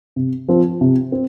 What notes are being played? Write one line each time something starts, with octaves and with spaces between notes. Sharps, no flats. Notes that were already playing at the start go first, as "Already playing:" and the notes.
C3
F3 C4
C3
C4